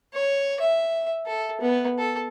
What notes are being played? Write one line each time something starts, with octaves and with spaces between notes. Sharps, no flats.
C#5
E5
A4
B3
A4